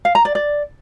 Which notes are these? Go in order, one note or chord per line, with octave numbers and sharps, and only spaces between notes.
F5
A#5
D5
D5